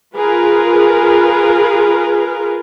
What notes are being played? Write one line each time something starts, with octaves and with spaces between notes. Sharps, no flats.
F4 G#4 A#4 B4